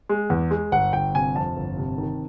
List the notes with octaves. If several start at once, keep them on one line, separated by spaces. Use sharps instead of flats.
G#3
E2
G#3
G1 F#5
G1 G5
C3 G#5
F2 A5
G1
C3
D#3